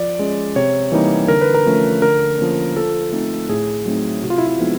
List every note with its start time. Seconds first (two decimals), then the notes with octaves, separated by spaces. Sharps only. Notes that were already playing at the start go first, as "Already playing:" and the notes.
Already playing: F3 D5
0.19 G#3 C#4
0.56 C3 C#5
0.92 E3 G3 A#3 D#4
1.28 D3 A#4
1.41 B4
1.55 A#4
1.66 F3 A3 C#4
2.02 D3 A#4
2.39 F3 A#3 C#4
2.76 F3 A4
3.12 A3 C4 D#4
3.49 A2 G#4
3.86 F#3 A3 C4 D#4
4.23 C3 F#4
4.30 F4
4.38 E4
4.47 F4
4.59 F3 G#3 B3 D#4